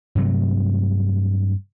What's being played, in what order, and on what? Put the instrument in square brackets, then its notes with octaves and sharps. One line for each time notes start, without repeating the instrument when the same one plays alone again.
[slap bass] G2 C3 F#3 A3